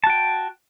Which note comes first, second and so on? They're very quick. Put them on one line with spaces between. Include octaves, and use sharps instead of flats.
A5 F#4 G5